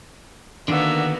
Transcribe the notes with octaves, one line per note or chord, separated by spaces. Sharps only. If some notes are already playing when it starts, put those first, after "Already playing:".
D3 D#3 A#3 B3 D4 F#4 E5